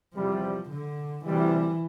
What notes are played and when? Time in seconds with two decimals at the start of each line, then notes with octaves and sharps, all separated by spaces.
0.15 E2 C3 F3 G3
0.70 D3
1.25 D2 C3 E3 G3